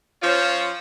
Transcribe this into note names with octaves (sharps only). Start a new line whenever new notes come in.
F3 C#4 F4 C5 C#5